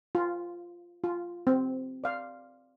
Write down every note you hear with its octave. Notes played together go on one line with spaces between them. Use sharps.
F4
F4
C4
D5 F5